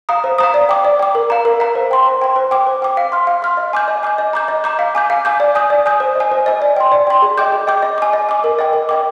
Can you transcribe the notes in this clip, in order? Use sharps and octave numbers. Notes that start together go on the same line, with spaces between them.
F5 A#5 D#6
C5
F5 A#5 D#6
D5
G5 D6
D5
G5 D6
A#4
F5 A#5
A#4
F5 A#5
C5
G5 C6
C5
G5 C6
C5
G5 D6
C5
G5 D6
F5
C6 F6
F5
C6 F6
D#5
G#5 D6 G6
D#5
G#5 D6 G6
D#5
A#5 D6 G6
D#5
A#5 D6 G6
F5
G#5 D6 G6
F5
G#5 D6 G6
D5
G#5 D#6 G6
D5
G#5 D#6 G6
C5
D#5
G#5
C5
D#5 G#5
D5
G5 C6
D5
G5 C6
G#4
D#5 G5 D6 G6
G#4
D#5 G5 D6 G6
D#5
G#5 D6
D#5
G#5 D6
A#4
D#5 G5 D6
A#4
D#5 G5 D6